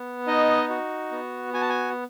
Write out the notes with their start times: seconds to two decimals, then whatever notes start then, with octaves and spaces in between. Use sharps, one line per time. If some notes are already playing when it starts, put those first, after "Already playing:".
Already playing: B3
0.27 D#4 D#5
0.70 F#4
1.11 B3
1.54 F#4 G#5
1.62 A5
1.69 G#5